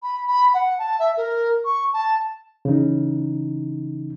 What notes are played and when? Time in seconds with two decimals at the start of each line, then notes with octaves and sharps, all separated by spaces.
0.03 B5
0.27 B5
0.54 F#5
0.79 A5
0.99 E5
1.17 A#4
1.65 C#6
1.93 A5
2.65 C#3 E3 D#4